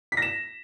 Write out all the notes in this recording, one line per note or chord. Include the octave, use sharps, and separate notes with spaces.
B6
A#6
E7